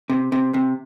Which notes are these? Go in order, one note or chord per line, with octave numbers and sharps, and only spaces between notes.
C3
C3
C3